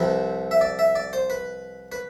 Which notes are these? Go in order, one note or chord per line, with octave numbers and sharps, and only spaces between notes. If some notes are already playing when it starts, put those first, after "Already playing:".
Already playing: C2 C3 F3 B4
E5
D5
E5
D5
C5
B4
B4